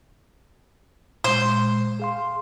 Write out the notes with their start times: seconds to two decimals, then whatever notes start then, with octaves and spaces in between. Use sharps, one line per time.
1.24 A#2 G#3 C5
2.00 G#4 F5 C6